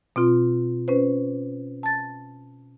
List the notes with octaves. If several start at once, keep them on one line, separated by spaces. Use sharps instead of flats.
B2 C4 F4
C#4 B4 C5
A5 A6